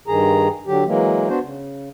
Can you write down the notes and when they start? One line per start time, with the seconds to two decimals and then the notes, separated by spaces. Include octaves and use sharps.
0.08 G2 D#3 G#4 A#5
0.67 D3 F#3 G4
0.86 E3 F#3 G#3 A#3
1.28 B3 D4 F#4 C5
1.43 C#3